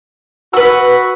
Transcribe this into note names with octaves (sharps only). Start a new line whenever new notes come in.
F#4 B4 E6